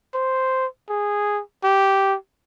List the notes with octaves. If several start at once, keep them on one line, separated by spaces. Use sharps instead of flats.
C5
G#4
G4